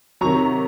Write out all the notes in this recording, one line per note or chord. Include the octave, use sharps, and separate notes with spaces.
C3 D#3 F#3 A#5 C#6